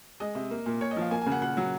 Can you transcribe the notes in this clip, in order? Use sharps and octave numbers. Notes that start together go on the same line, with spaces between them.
G#3 D#5
C3
A#3
A#2
A#2 C#5
D#5
F3
F5
A#3 G#5
G#5
C#3
F#5
A#2 F#5
F#3